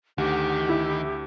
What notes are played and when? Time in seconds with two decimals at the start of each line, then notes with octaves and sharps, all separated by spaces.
0.18 D2 D#3 G4 F#5
0.69 E4